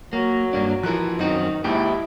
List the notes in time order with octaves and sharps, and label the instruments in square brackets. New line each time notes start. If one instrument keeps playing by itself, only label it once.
[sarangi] F#3 [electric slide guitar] A#3
[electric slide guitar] G2 A#3 D4
[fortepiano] E3 F#6 [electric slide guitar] F3 A#4
[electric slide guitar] F#2 C4 F#4 [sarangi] D#3 [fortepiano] D#4
[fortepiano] A#1 D#2 G#2 [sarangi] E4 [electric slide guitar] G4